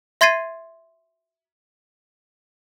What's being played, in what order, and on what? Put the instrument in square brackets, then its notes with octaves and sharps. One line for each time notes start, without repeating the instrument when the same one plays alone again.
[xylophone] E5 C6 G#6 A6 C7 D#7